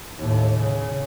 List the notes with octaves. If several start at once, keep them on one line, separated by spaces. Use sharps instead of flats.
D#2 A2
C#3